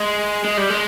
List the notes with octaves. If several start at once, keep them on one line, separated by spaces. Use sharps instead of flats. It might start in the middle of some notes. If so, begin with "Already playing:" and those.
Already playing: G#3
G#3
G3
G#3